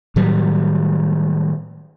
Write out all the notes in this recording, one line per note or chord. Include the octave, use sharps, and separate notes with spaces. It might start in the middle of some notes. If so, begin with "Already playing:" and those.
A2 D#3 F#3 G3